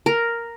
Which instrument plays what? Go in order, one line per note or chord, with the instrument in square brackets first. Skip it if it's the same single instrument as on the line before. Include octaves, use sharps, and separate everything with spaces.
[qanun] A#4